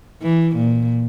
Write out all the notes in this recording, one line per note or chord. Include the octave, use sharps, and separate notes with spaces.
E3
A#2